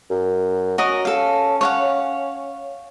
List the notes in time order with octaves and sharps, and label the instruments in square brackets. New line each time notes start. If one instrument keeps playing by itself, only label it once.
[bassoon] F#2
[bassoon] C#4 [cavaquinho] F#4 A#4 D#5
[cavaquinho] A4 F5
C#5 F5 F#5